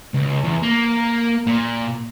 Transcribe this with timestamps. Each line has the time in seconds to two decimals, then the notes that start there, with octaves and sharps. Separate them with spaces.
0.14 C#2
0.44 E2
0.63 A#3
1.47 A#2